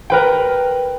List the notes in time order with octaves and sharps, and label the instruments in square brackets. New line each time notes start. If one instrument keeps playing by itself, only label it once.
[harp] A#4 B4 G5